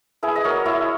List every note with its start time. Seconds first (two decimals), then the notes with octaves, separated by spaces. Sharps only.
0.23 E4 G#4 B4
0.36 D#5
0.44 F#3 A#4 C#5
0.65 E4 C#5 E5